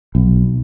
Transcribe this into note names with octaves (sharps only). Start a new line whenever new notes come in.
B1